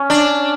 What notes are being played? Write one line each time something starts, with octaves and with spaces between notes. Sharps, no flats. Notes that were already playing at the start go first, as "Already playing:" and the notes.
Already playing: C#4
D4